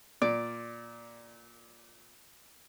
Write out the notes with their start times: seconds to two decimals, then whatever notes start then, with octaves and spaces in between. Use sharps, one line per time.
0.22 A#2 D5